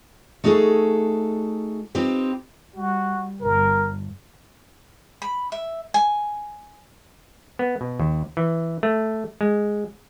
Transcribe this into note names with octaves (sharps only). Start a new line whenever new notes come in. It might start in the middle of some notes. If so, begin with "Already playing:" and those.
A3 D#4 F#4 G#4 A4
C4 D#4 F4 G4 B4
G3 F#4
G1 A#4
B5
E5
G#5
B3
B2
D#2
E3
A3
G#3